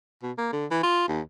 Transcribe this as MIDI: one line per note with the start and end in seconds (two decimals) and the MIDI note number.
0.23 0.32 47
0.38 0.48 58
0.52 0.66 50
0.71 0.81 52
0.83 1.08 65
1.09 1.21 39